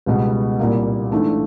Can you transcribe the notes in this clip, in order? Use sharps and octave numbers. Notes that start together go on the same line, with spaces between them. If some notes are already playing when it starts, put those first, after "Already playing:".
C#2 B2 G3 B3
C2 A#2 G3 A#3
G#2 E3 A3 D4